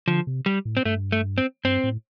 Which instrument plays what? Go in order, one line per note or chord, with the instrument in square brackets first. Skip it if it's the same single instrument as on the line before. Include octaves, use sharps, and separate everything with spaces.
[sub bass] D3 [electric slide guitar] F3
[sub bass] C3
[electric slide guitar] G3
[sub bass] A2
[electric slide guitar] C4
[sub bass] G2 [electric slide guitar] A3
[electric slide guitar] A3
C4
[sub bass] G2 [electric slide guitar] C4
[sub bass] A2